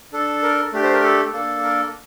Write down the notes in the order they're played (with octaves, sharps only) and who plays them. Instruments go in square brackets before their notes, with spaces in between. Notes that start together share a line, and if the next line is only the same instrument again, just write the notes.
[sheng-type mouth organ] D4 A4
A#4
A3 D4 G4
C5
A#4
A4
A#3 D4 A4
A#4